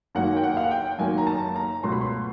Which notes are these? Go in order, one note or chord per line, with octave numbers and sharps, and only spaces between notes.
F#1 F#2 D#3 F#3 A#3 F#5
G5
F#5
F5
F#5
G5
F#1 F#2 D#3 F#3 A#3 G#5
A#5
A5
A#5
C#2 B2 F#3 A3 C6
B5
C6